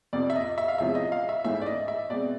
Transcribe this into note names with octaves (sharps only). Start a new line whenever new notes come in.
F2 C3 F3 D5
E5
D#5
E5
F5
E2 C3 F3 G#3 C#4 E5
D#5
F5
E5
G#2 E3 A3 C#4 E5
D5
D#5
E5
B2 G#3 C4 D5